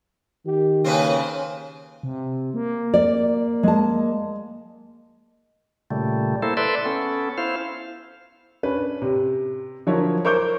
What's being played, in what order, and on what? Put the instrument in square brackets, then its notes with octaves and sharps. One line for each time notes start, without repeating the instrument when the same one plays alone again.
[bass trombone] D#3 [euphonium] G4
[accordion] C#3 [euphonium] A#3 [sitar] C4 C#4 B4
[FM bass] C3
A#3
[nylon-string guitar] D5
G#3 A5
[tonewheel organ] A#2 C#3 G3 A3
A#3 E4 A4 C5
A4 B4 D5 E5 C6
B3 C#4 A4
E4 C5 F5
[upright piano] C#4 D4 B4
C3
D3 F3 F#3 E4 A#4 C#5
A#4 C5 C#5 C#6 D6 G6